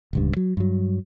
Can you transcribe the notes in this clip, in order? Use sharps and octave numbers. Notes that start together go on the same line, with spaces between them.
D1 C#2 G2
F#3
G2 F#3